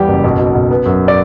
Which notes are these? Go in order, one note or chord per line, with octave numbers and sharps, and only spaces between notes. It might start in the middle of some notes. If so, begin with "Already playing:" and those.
Already playing: E2 G3 G4
F#1
B1
B2
B1
B3
F#2
D5